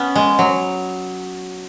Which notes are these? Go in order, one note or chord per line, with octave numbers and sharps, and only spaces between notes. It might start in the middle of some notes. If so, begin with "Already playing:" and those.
Already playing: B3 C#4
G#3
F#3